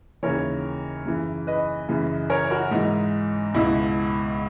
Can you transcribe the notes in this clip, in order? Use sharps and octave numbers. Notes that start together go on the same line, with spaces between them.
D#2 C#3 E3 A#4 C#5
F#2 C#3 E3
B4 D#5
F#2 C#3 E3
A#4 C#5
F#4 A#4
G#2 E3 D#4
C#2 B2 E4